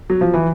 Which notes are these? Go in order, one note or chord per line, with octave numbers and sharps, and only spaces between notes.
F#3
F3
E3